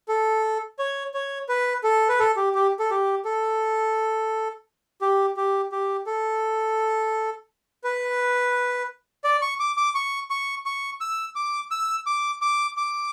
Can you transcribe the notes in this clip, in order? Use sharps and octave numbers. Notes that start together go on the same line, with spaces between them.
A4
C#5
C#5
B4
A4
B4
A4
G4
G4
A4
G4
A4
G4
G4
G4
A4
B4
D5
C#6
D6
D6
C#6
C#6
C#6
E6
D6
E6
D6
D6
D6